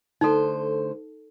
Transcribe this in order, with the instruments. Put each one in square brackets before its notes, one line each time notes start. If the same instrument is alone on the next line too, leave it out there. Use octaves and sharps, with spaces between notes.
[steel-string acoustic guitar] D3 A3 C5 [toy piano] D#4 A4